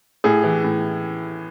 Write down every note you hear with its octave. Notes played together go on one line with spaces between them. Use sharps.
A2 G#4
E3
A2